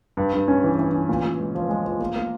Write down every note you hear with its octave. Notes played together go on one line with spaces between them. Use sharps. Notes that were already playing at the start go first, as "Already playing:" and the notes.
G2
G2
C#4
E3
E3
C#4
A#2
A#2
G#3
F3
G#3
F3
A#3
A#3